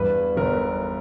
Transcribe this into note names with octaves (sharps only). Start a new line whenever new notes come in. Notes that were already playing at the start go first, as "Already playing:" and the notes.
Already playing: E2 G2 B4
G1 A#4